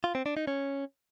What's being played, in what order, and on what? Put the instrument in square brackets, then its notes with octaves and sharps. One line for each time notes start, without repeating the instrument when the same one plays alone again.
[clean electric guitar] F4
C4
D4
D#4
C#4